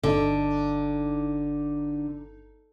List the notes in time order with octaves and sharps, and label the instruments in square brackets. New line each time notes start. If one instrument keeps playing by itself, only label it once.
[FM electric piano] G1 D#4 [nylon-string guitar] D3